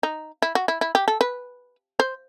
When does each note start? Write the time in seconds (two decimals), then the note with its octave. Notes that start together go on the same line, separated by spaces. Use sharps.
0.03 D#4
0.42 E4
0.55 F#4
0.68 E4
0.81 E4
0.95 G4
1.08 A4
1.21 B4
2.00 C5